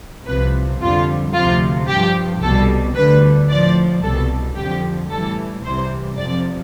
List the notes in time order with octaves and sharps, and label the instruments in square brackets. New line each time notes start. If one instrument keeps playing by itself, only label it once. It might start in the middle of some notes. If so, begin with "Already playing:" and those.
[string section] C2 C3 F3 B4
F2 D3 G3 F4
D2 C3 F3 F4
G2 F3 G4
C2 B2 G3 A4
D2 D3 G3 B4
A2 F3 D5
C2 B2 G3 A4
F2 D3 F3 G4
A2 E3 G3 A4
C2 C3 E3 G3 C5
F2 C3 F3 D5